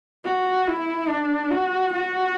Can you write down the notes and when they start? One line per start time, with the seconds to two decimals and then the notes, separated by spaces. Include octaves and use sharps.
0.25 F#4
0.67 E4
1.09 D4
1.50 F#4
1.93 F#4